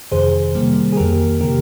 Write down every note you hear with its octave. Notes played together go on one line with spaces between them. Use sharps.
F2 C3 D#3 G#4 C5
C3 D#3 G3 A#3
G#4
F2 D#3 A#3 G4 A#4
C3 D#3 A#3 G4 A#4